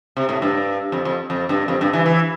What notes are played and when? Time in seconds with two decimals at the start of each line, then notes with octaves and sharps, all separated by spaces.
0.17 C3
0.29 A2
0.42 G2
0.92 F2
1.05 F2
1.30 F2
1.49 G2
1.68 F2
1.81 G2
1.93 E3
2.06 E3